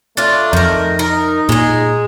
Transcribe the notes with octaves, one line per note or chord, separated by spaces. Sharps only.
A3 D4 F4
F2 D#3 A#4
D#4 A#4
A#2 G#3 G#4